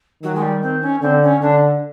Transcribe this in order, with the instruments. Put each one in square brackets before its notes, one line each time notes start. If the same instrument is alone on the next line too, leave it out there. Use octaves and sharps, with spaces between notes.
[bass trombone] D#3 [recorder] F#3
[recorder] G#3
G3
C4
C#4
[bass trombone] D3 [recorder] C4
[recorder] C#4
[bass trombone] D3 [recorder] D4